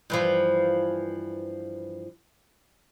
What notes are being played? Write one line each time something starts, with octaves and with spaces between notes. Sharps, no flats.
G2 E3 F3